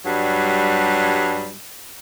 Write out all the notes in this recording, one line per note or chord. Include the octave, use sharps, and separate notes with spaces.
G2 F#3 G3